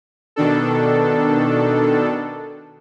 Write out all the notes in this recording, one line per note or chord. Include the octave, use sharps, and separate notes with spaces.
B2 D#3 D4 A4